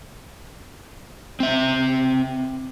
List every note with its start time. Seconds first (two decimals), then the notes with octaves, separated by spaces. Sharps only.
1.40 C4 E5